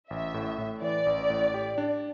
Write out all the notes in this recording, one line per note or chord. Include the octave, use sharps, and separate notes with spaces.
A1 E5
A2
A2
E3 D5
A1
A2
G4
D4